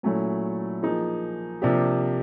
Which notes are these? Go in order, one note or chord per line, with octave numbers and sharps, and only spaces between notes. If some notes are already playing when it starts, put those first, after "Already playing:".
A#2 F#3 A3 C#4 E4
F3 A#3 D#4 G#4
C3 F3 A#3 D4 G4